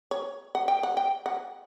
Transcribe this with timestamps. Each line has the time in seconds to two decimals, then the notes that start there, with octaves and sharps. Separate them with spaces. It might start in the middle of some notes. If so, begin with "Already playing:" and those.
0.11 C#5
0.55 F#5
0.68 G5
0.83 F#5
0.97 G5
1.26 F#5